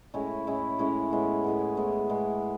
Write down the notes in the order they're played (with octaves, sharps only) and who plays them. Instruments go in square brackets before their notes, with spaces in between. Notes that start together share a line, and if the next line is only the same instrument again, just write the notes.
[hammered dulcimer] A2 G#3 C#4 E4
A2 G#3 C#4 E4
A2 G#3 C#4 E4
A2 G#3 B3
A2 G#3 B3
A2 G#3 B3
A2 G#3 B3